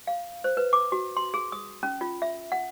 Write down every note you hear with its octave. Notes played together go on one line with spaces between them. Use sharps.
F5
C5
B4
D6
F#4
C6
G#4
D#6
C#4
F4
E5
F#5